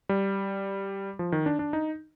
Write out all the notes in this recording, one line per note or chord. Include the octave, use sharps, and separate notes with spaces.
G3
F3
D#3
D4
D4
D#4